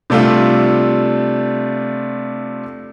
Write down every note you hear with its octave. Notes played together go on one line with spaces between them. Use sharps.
C3 G3 A3 D4 F4